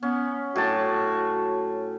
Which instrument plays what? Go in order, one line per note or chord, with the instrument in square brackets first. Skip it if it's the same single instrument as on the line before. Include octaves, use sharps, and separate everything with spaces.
[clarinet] B3 [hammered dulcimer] C#4
[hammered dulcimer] A2 A5 [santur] F#3 D4 C#5 [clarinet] F#4